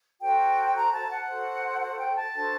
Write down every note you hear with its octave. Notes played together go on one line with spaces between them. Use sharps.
F#4 A4 C5 G5
A#5
A5
F#5
F#4 A4 C5
F#5
G5
A5
D4 F#4 A4 C5